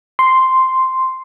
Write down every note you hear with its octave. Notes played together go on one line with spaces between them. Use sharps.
C6